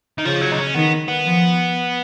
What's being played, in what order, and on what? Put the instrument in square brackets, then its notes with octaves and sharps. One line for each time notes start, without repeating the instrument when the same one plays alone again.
[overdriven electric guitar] D#3
[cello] C#3 [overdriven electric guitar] F3
[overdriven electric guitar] F#3
D#4
C#4
[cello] D#3 [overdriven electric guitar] B3
[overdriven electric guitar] B3
[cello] F3